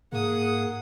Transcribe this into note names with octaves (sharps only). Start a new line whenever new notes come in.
G#2 A#3 G#4 F#5 D#6